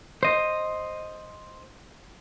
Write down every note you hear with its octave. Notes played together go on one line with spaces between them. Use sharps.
C5 D#5